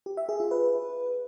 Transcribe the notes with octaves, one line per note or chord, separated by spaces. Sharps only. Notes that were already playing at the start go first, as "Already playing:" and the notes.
G4
E5
G#4
F4
B4